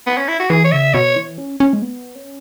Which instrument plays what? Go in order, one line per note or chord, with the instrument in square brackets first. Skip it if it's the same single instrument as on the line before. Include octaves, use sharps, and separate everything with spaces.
[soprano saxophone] B3
C#4
E4
F#4
[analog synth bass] E3 [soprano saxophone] G#4
[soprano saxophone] C#5
[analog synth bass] C#3 [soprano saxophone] E5
[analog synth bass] B2 [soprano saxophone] C#5
[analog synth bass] E3
C#4
C#4
G#3
B3
C#4